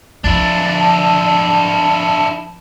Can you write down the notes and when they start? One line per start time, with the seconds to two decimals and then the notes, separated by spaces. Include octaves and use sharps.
0.24 F2 F3 D4 E4 A6
0.80 A5